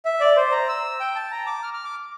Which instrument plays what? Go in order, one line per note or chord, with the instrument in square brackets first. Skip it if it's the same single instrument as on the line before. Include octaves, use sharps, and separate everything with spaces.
[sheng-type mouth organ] E5
D5
C5
A#5
E6
G5
A5
A#5
D6
F6
F6
D6